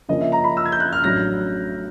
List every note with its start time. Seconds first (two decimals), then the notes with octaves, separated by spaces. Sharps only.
0.09 C#3 F3 A#3 C#4 D#5
0.21 E5
0.32 A#5
0.44 B5
0.57 E6
0.65 G#6
0.72 G6
0.80 F#6
0.93 F6
1.04 A1 A2 F#3 A3 D4 A#6